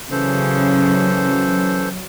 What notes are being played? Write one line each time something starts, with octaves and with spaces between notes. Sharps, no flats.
C#3 E3 F#3 C#4 A4 C5